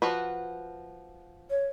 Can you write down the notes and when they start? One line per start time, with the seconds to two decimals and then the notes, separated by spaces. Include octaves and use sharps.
0.02 F3 F#4 B4
1.50 C#5